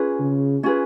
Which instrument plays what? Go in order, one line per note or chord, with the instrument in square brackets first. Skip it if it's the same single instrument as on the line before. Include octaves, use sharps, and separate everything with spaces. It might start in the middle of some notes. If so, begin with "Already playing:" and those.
Already playing: [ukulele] C#4 F4 G#4 B4
[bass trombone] C#3
[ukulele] C#4 F4 G#4 B4